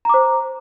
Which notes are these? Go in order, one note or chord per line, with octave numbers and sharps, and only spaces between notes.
C5 A#5 D6